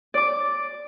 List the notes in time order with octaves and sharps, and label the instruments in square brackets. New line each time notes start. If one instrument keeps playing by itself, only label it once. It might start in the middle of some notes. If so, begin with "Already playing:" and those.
[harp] D5 D6